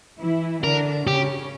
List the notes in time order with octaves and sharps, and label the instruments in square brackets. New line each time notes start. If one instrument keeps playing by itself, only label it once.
[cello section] E3 E4
[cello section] D3 D4 [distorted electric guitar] A#4
[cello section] C#3 C#4 [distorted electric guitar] G4